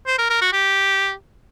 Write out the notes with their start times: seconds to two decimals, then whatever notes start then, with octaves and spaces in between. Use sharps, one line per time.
0.07 C5
0.18 A#4
0.30 A#4
0.41 F#4
0.53 G4